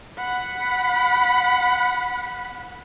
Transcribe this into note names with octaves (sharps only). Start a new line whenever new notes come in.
F#5 B5